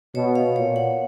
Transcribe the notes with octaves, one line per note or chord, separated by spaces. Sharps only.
B2 C#5
F5
A#2 C#5
F#5